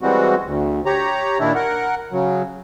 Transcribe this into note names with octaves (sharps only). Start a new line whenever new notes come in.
E3 G3 G#3 C4 F#4
D2
G4 C#5 A#5
A#2 D#3 D4 E4
A#4 F#5
C#3 F#3